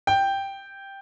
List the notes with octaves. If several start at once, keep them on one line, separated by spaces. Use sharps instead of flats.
G5